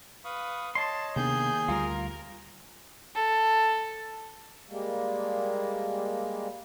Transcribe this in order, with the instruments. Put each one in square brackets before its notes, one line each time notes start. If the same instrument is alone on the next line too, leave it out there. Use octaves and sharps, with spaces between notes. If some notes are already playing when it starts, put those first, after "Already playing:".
[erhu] B4 [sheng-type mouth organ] F5 C#6 D#6
[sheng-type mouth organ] C#5 D#5 [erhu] A5 [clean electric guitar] C6
[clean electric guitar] D#2 [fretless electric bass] C3 B3 D4 [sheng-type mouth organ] G#4 G#5 [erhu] G6
[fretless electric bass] D2 G3 [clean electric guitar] F4 [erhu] A#4
[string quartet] A4
[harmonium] G3 G#3 A#3